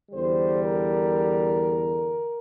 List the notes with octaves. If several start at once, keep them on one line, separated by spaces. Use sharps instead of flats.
E2 D3 G3 C5
A#4